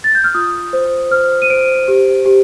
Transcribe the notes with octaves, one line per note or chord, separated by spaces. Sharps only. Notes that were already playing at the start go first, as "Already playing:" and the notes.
A6
G6
F6
F4 D#6
C5
C5 F6
D#7
C5 D7
G4
G4